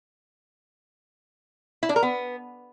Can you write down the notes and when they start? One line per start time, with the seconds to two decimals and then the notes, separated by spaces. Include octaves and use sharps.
1.83 E4
1.89 D4
1.96 A#4
2.03 B3